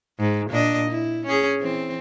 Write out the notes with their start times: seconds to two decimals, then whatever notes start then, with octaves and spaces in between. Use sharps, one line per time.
0.20 G#2
0.50 A#2 D4 D#5
0.90 E4
1.26 C#4 G#4
1.59 E3 C4